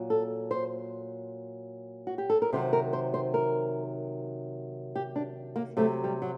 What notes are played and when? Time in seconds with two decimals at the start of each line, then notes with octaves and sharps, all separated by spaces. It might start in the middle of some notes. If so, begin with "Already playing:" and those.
Already playing: A#2 F#3
0.10 A4
0.51 C5
2.07 F#4
2.18 G4
2.30 A4
2.42 A#4
2.53 C3 D#3 F#3 C5
2.73 A#4
2.93 C5
3.14 C5
3.34 A#4
4.96 G4
5.16 D4
5.56 A#3
5.77 C3 F#3 A3
6.04 G3
6.22 F#3